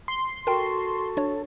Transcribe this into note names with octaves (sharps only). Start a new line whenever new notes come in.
C6
F#4 A4 A#4 G5
D4 C#5